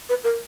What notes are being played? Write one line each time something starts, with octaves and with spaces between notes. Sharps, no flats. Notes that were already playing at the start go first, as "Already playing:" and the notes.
B4
A#4